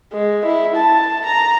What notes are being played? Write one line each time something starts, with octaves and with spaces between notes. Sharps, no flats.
G#3
E4
A5
A#5